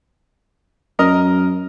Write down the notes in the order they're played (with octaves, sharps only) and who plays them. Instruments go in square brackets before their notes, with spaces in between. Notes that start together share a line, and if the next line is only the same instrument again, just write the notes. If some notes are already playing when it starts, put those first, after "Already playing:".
[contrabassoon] F#2 [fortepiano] A#4 D#5 A#5